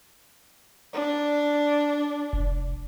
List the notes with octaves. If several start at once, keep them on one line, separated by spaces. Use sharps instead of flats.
D4
F1